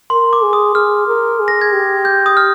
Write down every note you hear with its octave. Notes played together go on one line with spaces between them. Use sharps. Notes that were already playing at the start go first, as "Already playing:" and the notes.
A#4 C6
D6
G#4
D#6
G#4 F6
A#4
G#4
A#6
G#6
G4
G6
D#6
F6